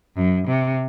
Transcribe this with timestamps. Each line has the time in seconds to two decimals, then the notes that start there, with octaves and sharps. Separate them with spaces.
0.16 F#2
0.47 C3